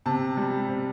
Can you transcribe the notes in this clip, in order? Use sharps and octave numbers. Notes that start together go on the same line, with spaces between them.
C3 A5
G3
C3